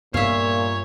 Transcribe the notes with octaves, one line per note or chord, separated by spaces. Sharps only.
G2 A#2 B3 C#5 E5 F5